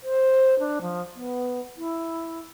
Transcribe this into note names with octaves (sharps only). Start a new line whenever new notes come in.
C5
D4
F3
B3
E4